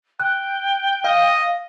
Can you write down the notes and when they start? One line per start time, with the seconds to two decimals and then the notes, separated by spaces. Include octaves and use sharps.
0.20 G5 F#6
1.04 D#5 F5